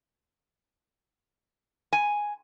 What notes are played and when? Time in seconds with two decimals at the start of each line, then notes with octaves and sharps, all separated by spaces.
1.93 G#5